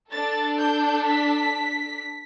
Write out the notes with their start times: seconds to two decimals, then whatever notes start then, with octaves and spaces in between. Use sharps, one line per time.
0.11 D4 A4 A6
0.58 G6
1.04 B6